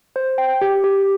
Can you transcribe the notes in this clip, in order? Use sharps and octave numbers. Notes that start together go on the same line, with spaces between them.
C5
G5
G4
G4